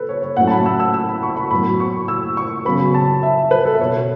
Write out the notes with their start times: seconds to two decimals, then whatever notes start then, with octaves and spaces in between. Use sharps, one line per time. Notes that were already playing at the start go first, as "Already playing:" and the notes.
Already playing: A4 B4
0.09 C#5
0.23 C#5
0.37 A2 F#3 A3 C#4 F#5
0.47 A5
0.51 B5
0.66 E6
0.80 E6
0.94 E6
1.09 B5
1.23 C#6
1.37 B5
1.51 A2 F#3 B3 B5
1.80 C#6
2.08 E6
2.37 C#6
2.65 C#3 F#3 B3 B5
2.94 A5
3.23 E5
3.51 B4
3.65 A4
3.74 E5
3.79 B2 B3 C#5